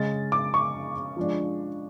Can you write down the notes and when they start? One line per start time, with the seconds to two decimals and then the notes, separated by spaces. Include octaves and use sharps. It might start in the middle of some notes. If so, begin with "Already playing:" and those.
Already playing: C#3 G#3 C#4 A6
0.32 D6
0.54 C#6
1.17 F3 G#3 D4